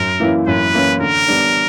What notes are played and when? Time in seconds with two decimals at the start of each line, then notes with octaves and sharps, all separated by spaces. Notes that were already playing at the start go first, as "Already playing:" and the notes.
Already playing: F#2 A#4
0.20 E3 A#3 C#4 E4
0.47 F#2 B4
0.74 E3 A#3 C#4 E4
1.01 D3 A#4
1.28 G3 B3 D4